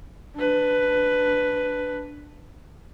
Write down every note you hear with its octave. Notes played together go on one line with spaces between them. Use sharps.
D4 B4